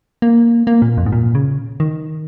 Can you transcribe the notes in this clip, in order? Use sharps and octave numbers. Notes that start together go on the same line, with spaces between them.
A#3
A#3
A#2
F2
G#2
A#2
C#3
D#3